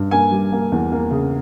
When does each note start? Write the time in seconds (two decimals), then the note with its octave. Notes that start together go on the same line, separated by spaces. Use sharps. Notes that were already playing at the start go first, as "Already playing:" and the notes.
Already playing: G2
0.11 A#3 G#5
0.31 G3
0.52 A#3
0.72 E2
0.92 A#3
1.11 C#3